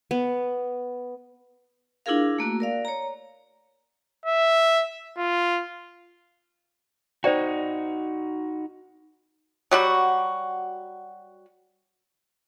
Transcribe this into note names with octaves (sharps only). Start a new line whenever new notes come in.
B3
D4 E4 F4 G#4 A#4 F5
A3 A#3 F#4
A#4 D5 F5
C#5 A#5
E5
F4
D#4 F#4 C5 D5 G5
F#3 G3 F#4